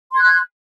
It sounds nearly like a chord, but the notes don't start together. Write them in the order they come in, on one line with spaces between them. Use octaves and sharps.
C6 G#6 F#6